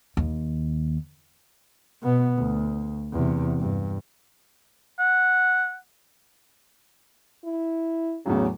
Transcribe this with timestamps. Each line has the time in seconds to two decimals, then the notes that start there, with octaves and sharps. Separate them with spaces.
0.17 D#2
2.02 B2 B3
2.38 D2
3.13 E2 C3
3.60 G2
4.99 F#5
7.44 E4
8.26 E2 A2 C#3 F#3